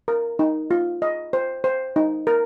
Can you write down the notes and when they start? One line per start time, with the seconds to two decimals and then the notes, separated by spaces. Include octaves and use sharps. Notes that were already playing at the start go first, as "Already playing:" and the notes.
0.08 A#4
0.39 D#4
0.71 F4
1.02 D#5
1.33 C5
1.64 C5
1.96 D#4
2.27 A#4